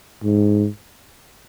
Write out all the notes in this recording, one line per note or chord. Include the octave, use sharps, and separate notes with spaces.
G#2